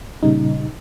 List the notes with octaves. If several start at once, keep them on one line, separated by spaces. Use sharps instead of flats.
A#2 C#3 G3 D#4